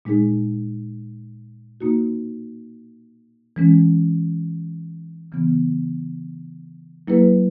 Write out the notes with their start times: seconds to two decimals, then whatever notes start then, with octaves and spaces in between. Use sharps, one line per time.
0.05 A#2 G#3 D#4 G#4
1.81 B2 A#3 D#4 F#4
3.56 E3 G#3 C#4
5.32 C#3 E3 B3
7.08 F#3 A#3 E4 G#4 B4